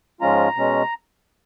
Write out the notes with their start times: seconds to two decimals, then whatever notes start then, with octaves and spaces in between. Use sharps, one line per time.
0.21 G#2 F3 G#3 C#4 F4 A#5
0.55 B2 G#3 C#4